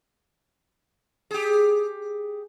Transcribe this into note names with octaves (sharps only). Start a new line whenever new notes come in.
G4 G#4